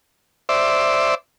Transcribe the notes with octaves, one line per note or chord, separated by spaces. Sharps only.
C5 D5 E5